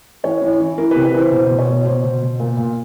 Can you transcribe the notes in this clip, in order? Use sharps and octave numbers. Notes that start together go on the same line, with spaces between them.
E3 C#5
E3
E3
E3 A#4
C3 B4
B4
E3 C5
B2 C5
B2
C#5
B2
B2 C5
B2
B2
A#2 A#4
A#2